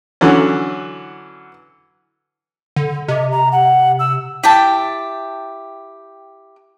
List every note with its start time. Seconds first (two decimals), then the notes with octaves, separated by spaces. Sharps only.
0.21 D3 E3 F#3 C#4
2.76 D3
3.08 C3 D#5
3.32 A#5
3.52 F#5
3.99 E6
4.43 E4 G4 G5 A5